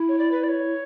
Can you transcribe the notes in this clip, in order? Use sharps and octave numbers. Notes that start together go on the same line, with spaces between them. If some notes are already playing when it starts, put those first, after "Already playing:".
Already playing: E4
C#5
D5
B4
D5
C#5